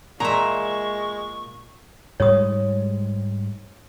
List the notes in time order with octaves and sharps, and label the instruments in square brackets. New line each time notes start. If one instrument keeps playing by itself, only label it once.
[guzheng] A#2 E5 [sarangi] G#3 [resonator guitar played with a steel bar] A#5 [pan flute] C#6
[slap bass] G#2 G3 G#3 [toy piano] C#5 D#6